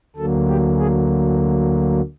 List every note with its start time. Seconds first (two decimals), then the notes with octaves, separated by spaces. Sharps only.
0.16 D2 D3 F#3 A#3 A4
0.48 G4
0.78 G#4